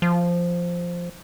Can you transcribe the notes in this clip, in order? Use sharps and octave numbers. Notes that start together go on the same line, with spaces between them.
F3